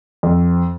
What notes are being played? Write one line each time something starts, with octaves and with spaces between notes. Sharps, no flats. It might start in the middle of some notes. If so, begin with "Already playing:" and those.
F2